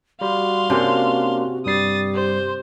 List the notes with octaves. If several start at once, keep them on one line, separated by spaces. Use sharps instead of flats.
G3 F#4 F5 C6
C3 A#3 C#4 D4 C5
G2 G3 G4 D#6 A6 C7
C5